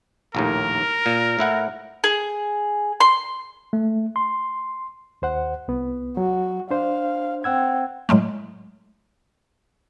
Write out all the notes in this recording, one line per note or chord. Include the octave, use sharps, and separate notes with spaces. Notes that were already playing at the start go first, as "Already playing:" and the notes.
A#1 D#2 A2 A#4
A#2
A2 E4 F#5
G#4
C6
A3
C6
D#2 C5 F#5
C2 B3
F#3 F#4
D4 C5 F5
C4 F#5 E6 G#6
A2 F#3 G#3 A3